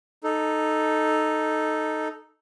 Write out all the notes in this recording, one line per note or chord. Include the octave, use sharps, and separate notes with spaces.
D#4 A4